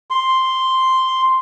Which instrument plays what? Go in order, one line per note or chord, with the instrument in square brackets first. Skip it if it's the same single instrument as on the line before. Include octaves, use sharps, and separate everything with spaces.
[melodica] C6